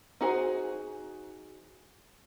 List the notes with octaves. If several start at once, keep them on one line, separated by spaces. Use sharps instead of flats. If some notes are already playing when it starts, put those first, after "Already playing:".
D#4 F#4 G#4 C5